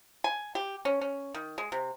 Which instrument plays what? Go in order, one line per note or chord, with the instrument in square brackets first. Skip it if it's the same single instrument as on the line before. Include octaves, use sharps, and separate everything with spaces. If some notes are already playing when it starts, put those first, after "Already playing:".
[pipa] G#5
G4
C#4
C#4
D#3
G#3
C3